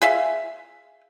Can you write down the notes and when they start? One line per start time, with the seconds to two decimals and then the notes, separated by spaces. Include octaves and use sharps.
0.02 G#4 E5 F5